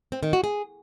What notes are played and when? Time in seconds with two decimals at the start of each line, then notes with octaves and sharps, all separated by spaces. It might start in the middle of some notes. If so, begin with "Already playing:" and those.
0.12 C4
0.23 D#3
0.33 F#4
0.44 G#4